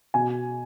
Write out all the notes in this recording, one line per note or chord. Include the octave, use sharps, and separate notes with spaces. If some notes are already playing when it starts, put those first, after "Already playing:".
B2 G#5